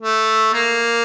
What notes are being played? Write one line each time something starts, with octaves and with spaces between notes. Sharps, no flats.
A3
A#3